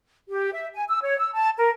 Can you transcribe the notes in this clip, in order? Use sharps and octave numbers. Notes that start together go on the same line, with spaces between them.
G4
E5
G#5
E6
C#5
E6
A5
A#4